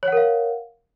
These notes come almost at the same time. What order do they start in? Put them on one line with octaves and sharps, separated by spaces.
C#5 F#5 A#4 F5